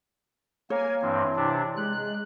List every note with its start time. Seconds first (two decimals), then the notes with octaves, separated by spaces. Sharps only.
0.70 A#3 C#5 G#5
1.02 G2 E3 C4
1.36 C3 D4
1.76 G#3 F#6